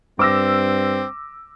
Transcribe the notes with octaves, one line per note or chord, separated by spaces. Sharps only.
G2 C4 D6 E6 A#6